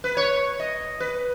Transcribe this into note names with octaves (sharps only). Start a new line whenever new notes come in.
B4
C#5
D#5
B4